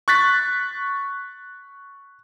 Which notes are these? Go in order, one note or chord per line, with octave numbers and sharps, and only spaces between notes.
C#6 F#6 A6 B6